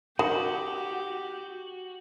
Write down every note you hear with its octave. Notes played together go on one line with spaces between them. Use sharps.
D#3 F#4 G4